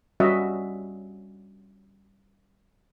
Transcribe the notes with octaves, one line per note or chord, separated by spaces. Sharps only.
G3 C#4 F#4 D#5 E5 F#5